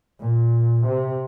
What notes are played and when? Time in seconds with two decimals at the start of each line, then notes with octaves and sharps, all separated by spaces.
0.20 A#2
0.86 C3